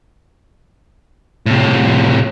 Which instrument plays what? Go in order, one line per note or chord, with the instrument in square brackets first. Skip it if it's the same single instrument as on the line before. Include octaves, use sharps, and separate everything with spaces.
[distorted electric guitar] A2 C3